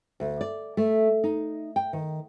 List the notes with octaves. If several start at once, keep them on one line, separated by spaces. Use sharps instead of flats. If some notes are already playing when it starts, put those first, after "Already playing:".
D2
D5
A3
D#4
G5
D#3